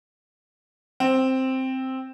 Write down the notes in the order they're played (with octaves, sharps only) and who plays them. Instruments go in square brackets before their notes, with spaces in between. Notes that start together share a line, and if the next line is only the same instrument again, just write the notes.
[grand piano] C4